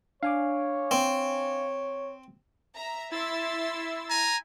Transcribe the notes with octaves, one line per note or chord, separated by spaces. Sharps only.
D4 C#5 F5 G#5 D6
C4
E5 A#5
E4 E5 C6 E6 A6
G#5 A#5